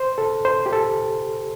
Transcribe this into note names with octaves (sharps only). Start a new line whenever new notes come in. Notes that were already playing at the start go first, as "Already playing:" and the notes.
Already playing: C5
A4
C5
G4
A4